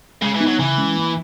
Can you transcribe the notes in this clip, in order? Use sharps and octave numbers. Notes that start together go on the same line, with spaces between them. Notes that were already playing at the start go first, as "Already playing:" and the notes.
C#3 G#3
E3
B3 D#4
F#3
C#3 E3
G#3 C#4
A#3